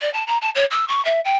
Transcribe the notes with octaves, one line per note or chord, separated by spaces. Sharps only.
D5
A5
A#5
A5
C#5
E6
C#6
E5
G5